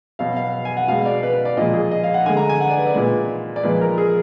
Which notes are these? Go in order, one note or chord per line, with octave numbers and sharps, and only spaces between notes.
B2 F#3 F5
F5
G#5
F#5
B2 G#3 F5
D5
B4
B4
D5
A#2 F3 G#3 D#5
G#4
D#5
F5
F#5
D3 G#3 G#5
A#5
G#5
F#5
D5
B4
D5
A#2 G#3 B4
D5
A#2 F3 G#3 B4
A#4
G#4